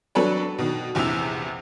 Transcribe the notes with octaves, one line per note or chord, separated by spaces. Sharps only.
F#3 C4 D4 A4 B4 C#5
B2 D#3
A#1 E2 C3 E4 E6 F7